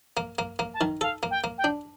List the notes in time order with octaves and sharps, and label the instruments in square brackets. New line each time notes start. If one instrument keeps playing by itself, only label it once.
[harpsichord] A#3
A#3
A#3
[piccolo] A5
[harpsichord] D#3
[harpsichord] A4 [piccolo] F5
[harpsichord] A#3
[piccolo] G5
[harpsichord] A#3
[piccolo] G5
[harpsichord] D4